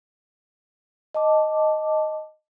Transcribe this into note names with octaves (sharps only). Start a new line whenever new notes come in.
D#5 A5 D6